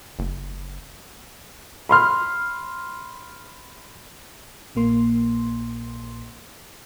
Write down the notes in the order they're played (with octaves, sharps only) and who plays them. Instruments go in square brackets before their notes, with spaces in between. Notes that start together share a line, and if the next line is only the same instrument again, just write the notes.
[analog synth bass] F#1
[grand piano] B5 C6 F6
[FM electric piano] A#1 A#2 A#3 C6